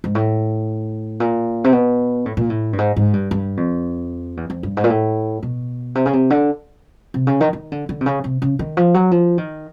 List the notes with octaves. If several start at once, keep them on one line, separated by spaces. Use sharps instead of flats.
G#2
A2
A#2
C3
B2
A2
A#2
A2
G2
G#2
G#2
G2
G2
F2
E2
F2
G2
G#2
A#2
A2
B2
C3
C#3
C3
D3
C3
C#3
D#3
D#3
D3
D3
C3
C#3
C3
C#3
D#3
F3
F#3
F3
D#3